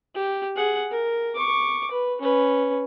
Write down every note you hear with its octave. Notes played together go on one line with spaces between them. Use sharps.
G4
G#4 F#5
A#4
C#6 D6
B4
C#4 B4